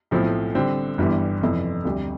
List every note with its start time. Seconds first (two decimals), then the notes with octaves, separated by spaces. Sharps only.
0.11 B1 A2 F3 C4 E4
0.55 D3 G3 C4
0.98 G1 G2 E3 G3
1.41 F1 F2 E3
1.85 D2 C3 G3